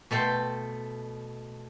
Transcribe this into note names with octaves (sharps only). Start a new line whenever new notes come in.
B2 A3 A4 G5 C6